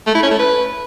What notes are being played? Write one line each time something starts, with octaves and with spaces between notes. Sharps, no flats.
A3
E4
C#4
A3
B4